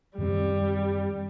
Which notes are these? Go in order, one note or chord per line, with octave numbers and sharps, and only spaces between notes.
F#2 D#3 G3 C4